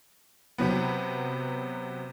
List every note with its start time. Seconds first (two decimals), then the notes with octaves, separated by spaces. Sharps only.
0.58 C3 F#3 B3